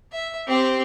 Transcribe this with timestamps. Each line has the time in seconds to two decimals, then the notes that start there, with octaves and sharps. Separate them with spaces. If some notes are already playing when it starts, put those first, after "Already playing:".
0.12 E5
0.48 C4 G4